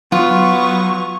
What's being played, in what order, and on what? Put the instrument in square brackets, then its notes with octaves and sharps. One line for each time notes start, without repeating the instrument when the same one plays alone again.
[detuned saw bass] F#3 [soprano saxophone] B3 [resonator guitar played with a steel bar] F4 [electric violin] C#6